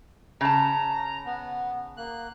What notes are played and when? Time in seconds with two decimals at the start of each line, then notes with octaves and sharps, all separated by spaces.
0.41 C#3 A5 A#5
1.26 B3
1.97 A#3 F#6